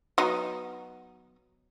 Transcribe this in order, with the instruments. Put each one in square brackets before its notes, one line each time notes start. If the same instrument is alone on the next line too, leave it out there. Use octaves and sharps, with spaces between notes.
[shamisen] F#3 B3 D#4